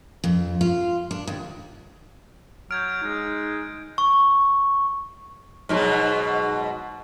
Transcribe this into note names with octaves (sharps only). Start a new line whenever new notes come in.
F2
F4
D4
D#2
F#3 F6 G6 G#6 D7
G#3 D#4
C#6
G#2 B2 F#3